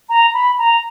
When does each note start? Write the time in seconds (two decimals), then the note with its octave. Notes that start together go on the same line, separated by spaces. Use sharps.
0.09 A#5
0.34 B5
0.58 A#5